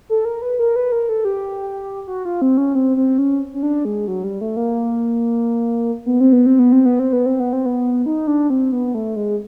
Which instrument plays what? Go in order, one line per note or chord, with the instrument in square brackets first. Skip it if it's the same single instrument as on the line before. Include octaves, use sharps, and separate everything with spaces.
[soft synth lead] A4
A#4
B4
A#4
B4
A#4
A4
G4
F#4
F4
C4
C#4
C4
C4
C#4
C#4
D4
G#3
F#3
G3
A3
A#3
B3
C4
B3
C4
B3
C4
B3
C4
B3
C4
B3
C4
B3
D#4
D4
C4
B3
A3
G#3